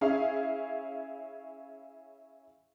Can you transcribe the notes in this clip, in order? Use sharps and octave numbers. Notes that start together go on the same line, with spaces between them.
C#4 E4 G#4 F5